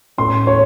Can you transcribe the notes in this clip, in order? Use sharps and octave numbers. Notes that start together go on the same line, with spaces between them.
A2 A3 C#4 C6
C#5